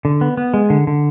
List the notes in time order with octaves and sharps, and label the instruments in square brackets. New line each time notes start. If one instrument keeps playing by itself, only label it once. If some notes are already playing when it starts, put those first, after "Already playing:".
[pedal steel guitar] D3
B3
B3
G#3
D3
D3